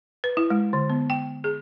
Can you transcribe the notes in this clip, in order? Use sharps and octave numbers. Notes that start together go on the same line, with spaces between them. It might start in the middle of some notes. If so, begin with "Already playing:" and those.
B4
E4
G#3
D3
B3
G5
G#4